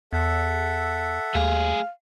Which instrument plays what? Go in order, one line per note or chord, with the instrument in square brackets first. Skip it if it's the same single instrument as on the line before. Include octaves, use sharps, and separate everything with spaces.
[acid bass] E2 [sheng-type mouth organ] A4 E5 F#5
[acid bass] D#2 [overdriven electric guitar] A3 G#4 [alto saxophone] F5